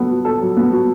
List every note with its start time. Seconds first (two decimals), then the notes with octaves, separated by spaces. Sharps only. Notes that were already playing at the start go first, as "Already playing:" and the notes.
Already playing: F#3 B3 A4
0.09 F#4
0.25 A4
0.41 F#3
0.57 B3
0.71 F#4